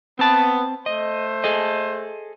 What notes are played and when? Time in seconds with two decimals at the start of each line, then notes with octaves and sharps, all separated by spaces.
0.19 B3 C4 A5
0.86 A3 C5 D#5
1.44 G#4 A4 D#5